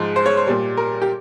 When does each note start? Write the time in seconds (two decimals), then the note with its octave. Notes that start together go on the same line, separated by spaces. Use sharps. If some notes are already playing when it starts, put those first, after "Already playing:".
Already playing: G#2 F3 G#3
0.16 C5
0.26 C#5
0.37 C5
0.47 A#2 G3
0.77 A#4
1.02 G4